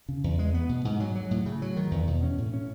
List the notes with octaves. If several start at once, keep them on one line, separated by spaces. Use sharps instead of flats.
C#3
E2
G#3
B3
B2
G#2
F#3
F#3
A2
C#3
F#3
D#3
E2
B2
C#4
A2
C#4